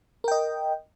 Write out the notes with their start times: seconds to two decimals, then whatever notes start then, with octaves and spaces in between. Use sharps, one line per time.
0.24 A#4
0.28 G5
0.31 D#5